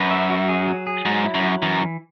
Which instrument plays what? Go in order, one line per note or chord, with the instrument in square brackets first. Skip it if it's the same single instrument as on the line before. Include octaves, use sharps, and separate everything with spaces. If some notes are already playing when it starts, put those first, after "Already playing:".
Already playing: [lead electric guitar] F#2 [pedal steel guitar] B4
[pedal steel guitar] E5
F#4
G#4
F#3
G#4
[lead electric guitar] G#2 [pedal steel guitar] F#3
[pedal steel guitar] E4
[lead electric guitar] F#2
[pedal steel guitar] F#3
[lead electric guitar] F#2 [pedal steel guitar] E3
[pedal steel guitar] E3